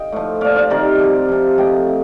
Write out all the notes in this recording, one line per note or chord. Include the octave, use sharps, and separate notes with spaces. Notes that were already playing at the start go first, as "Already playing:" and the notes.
Already playing: D#5 F5 G5
A2 F3
A#2 F3 D5 F5
D5 F5
C3 D#3 A#4 D5
C3 F3
C3 F3
A2 F3 D#5 G5
C3